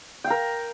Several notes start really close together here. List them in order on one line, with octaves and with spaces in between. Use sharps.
G5 F5 A#4